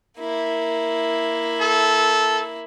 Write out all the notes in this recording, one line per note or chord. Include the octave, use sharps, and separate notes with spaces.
A#3 E4
A4